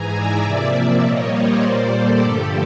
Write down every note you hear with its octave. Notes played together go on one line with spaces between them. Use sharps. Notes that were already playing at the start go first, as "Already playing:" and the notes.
Already playing: G#2 E3 G#3 G#5 A#5
D5 E5
C3 F3 A#3
A#2 G3 A#3 C#5 D#5
C5 D5
A#2 G3 A#3
G4 A4
G2 D3 F3 A3